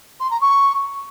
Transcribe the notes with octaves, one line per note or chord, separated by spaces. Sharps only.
C6
A#5
C#6